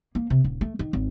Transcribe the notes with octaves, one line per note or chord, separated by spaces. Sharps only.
A#3
C3
D#1
A3
D#3
G#1